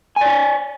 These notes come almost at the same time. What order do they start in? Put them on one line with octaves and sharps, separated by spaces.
G#5 D5 C#5